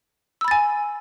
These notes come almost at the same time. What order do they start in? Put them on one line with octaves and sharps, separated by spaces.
E6 B5 A6 G#5